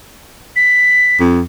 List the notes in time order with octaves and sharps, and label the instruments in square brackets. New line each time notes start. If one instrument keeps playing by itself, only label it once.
[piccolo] B6
[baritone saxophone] F2